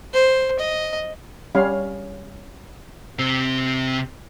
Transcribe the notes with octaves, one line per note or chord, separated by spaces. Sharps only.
C5
D#5
G3 C#4 F5
C3 C4